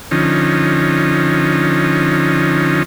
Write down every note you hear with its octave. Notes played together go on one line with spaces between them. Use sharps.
D3 F3 C#4 D#4